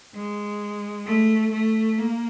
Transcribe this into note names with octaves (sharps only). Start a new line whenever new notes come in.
G#3
A3
A3
A#3